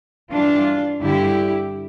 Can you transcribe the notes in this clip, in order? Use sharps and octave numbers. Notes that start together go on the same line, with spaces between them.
G2 E3 G3 D4 F4
G2 D3 G3 E4 G4